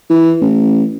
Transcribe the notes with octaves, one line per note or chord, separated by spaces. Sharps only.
E3
A1